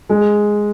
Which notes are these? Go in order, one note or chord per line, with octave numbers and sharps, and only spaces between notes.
G#3